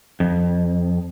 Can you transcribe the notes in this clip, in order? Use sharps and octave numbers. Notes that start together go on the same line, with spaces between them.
F2